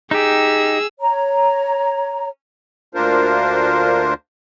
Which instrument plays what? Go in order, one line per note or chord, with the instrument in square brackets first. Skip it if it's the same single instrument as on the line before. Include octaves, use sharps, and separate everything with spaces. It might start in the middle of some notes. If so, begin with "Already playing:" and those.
[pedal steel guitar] D#4 G4 [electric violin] G#4 E6
[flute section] C#5 A#5
[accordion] D2 A#3 D4 F4 A#4 C5